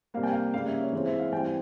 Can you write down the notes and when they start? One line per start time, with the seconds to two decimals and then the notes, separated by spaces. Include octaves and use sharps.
0.14 C3 G3 A#3 F5
0.23 G5
0.32 F5
0.54 C#3 G3 A#3 F5
0.67 E5
0.80 C#5
0.92 E3 G#3 C4 C#5
1.06 E5
1.19 F5
1.32 E3 G3 C4 G5